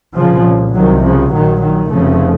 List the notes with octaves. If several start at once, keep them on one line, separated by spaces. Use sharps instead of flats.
C2 A#2 C#3 F3
C2 C3 D#3 F#3
C#3 F3
A#1 A#2 D#3 F#3
D#3 F#3
F1 F2 C#3 F3 A3